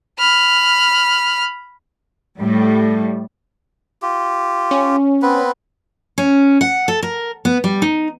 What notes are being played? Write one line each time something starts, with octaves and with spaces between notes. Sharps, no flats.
B5 F6
A2 G3
F4 G4
C#4
B3 C4 B4
C#4
F#5
A4
A#4
B3
G3
D#4